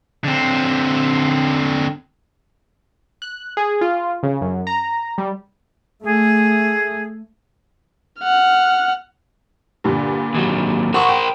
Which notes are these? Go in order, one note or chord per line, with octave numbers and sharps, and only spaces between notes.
D3 C4
F#6
G#4
F4
C#3
F#2
A#5
G3
A3 G#4
F#5 F6
G2 A#2 D3
D#2 F#3
A#4 C5 F#5 C#6 D#6
G5